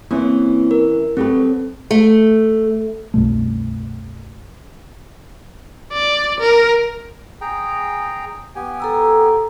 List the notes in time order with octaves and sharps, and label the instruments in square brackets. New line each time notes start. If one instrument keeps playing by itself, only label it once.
[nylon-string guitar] E3 C#4 E4 [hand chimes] A#3 C4
[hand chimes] A#4
[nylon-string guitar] F#3 G4 B4 [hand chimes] C4 A4
[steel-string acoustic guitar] A3
[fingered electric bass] C2 F#2 B2 A3
[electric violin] D5
A#4
[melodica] G#4 G5 A#5
B3 G4 G#5
[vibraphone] A4 A#5 E6